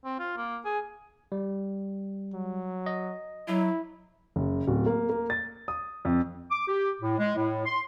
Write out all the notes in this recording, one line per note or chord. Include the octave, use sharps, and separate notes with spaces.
C4
F4
A#3
G#4
G3
F#3
D#5
F#3 E4
F#1
D1
A#3
A#3
A6
D#6
F2
D6
G4
A2
G#3
A2
C6